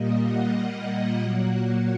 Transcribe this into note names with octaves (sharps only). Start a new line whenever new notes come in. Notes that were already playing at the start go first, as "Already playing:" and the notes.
Already playing: A#2 G3 A#3 D#5
F#5
F#5
A#2 F#3 A#3 F#5
F#5